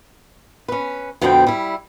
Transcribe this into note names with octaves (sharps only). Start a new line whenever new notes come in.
C#4 B4
F2 B2 D3 B3 C4 G5
G3 E4